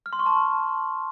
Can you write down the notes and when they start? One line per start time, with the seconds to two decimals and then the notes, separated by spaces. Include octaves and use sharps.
0.06 F6
0.13 C6
0.19 C#6
0.26 A5